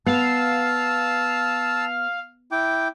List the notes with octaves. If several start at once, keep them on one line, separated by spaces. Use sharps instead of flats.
B3 F5 A5 E6
E4 G5 D6